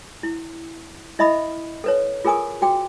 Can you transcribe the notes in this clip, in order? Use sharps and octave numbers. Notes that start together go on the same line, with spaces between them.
E4
E4 D#5 E5 B5 D#6
A4 B4 C#5
F4 G#4 A#4 G#5 C#6 D#6
F#4 G5 D6